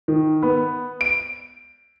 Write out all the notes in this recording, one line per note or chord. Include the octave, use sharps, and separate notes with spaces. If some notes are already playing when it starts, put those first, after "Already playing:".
D#3
B3
D7